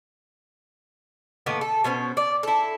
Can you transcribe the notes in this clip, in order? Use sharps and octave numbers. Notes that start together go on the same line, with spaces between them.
A2 D#3 A#3 B3
A4
B2 B3 C#4 C5
D5
E4 A4